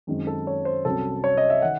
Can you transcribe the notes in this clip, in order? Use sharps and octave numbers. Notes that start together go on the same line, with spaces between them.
F#2 D#3 G#3 C4
A4
C#5
C5
C2 C3 F#3 C#4 A4
C#5
D#5
E5
D#3 F#5